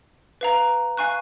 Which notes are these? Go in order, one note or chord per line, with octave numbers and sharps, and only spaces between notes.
B4 F5 A#5
F5 G#5 C#6 F#6